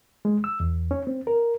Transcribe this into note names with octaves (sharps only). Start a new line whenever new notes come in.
G#3
E6
E2
C#4
C4
A#4